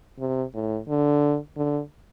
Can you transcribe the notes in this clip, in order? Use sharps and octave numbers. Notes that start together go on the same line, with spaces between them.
C3
A2
D3
D3